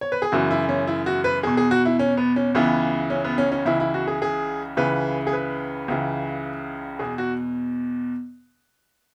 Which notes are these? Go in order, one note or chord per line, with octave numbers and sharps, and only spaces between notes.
C#5
B4
G#4
F#2 C#3 E3 F#4
E4
C#4
E4
F#4
B4
E2 B2 G#4
G#4
F#4
E4
C#4
B3
C#4
C#2 C#3 E3 B3
C#4
B3
C#4
C#4
C#2 C#3 E3 E4
E4
F#4
G#4
G#4
C#2 C#3 E3 B4
G#4
B4
C#2 C#3 E3
E2 B2 G#4
F#4